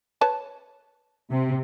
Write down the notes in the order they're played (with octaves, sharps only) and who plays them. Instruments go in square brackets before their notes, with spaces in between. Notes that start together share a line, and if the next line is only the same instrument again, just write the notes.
[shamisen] B4 C#5 A5
[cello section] C3